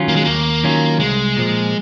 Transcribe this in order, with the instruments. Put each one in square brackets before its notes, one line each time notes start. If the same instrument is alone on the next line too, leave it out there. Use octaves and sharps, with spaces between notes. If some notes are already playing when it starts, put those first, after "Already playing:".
Already playing: [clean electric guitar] D#3 F#3 C#4 F4
[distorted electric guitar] A#3
G#3
[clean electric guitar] D#2 [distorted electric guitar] A#3
[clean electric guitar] D#3 F#3 C#4 F4
[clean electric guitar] C2 [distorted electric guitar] G#3
[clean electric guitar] A#2 F3